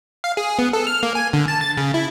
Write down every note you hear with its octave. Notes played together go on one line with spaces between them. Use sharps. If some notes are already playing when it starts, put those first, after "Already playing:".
F5
G#4
B3
A4
F6
A#3
G#5
D3
A5
A6
C#3
E4